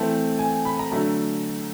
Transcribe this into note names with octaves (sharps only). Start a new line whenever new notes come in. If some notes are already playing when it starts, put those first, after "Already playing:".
Already playing: E3 A3 C4 A5
G#5
B5
A#5
D3 F#3 A3 A#5